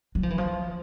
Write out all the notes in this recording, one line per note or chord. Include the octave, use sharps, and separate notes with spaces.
F#3
F3
E3
F3